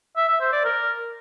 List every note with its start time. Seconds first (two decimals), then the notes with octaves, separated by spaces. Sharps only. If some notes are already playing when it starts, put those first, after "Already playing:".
0.17 E5
0.29 E5
0.41 C5
0.52 D5
0.64 A#4